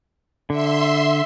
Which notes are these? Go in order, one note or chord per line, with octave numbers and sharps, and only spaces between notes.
D3 E5 C6